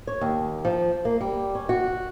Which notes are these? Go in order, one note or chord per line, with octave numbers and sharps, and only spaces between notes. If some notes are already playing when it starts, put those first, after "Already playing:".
C#5
D#2
F3
A#3
G3
C#4
F#4